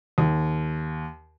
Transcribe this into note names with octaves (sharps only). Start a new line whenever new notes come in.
D#2